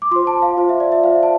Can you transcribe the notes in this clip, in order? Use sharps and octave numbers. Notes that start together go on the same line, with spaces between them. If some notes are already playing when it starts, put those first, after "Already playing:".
D6
F4 C5 C6
A5
F5
F4 C5
E5
D5
E5
F4 C5 F5
A5